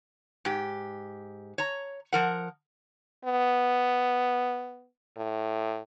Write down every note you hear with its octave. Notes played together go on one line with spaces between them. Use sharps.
G#2 G4
C#5 A#5
F3 A#4 F#5
B3
A2